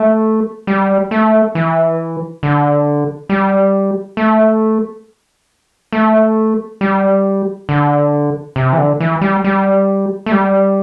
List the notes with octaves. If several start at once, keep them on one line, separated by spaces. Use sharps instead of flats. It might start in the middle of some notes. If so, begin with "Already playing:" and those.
Already playing: A3
G3
A3
E3
D3
G3
A3
A3
G3
D3
C3
E3
D3
E3
G3
G3
A3
G3